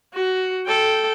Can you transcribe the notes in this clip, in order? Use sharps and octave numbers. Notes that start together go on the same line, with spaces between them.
F#4
A4 G5